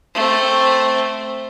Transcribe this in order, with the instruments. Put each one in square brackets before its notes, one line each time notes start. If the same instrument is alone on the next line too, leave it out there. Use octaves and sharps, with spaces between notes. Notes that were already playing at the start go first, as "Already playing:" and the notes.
[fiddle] A3 C4